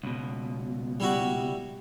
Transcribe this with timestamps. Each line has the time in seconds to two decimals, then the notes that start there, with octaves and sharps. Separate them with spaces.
0.04 C#2 B2
1.00 G3 E4 F#4